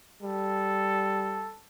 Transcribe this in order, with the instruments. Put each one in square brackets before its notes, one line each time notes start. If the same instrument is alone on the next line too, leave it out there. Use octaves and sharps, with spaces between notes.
[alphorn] G3 [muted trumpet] A4